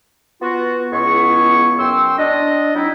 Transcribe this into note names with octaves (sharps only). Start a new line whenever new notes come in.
B3 F4 F#4
C#2 B3 E4 G#4 C#6
F#2 G5 C6 E6
D4 D#5
F#3 C4 D#4 E4